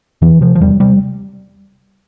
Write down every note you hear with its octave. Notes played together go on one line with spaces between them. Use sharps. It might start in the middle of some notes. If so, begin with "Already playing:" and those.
E2 E3
C3 F3
F3
E2 G3
C3 G3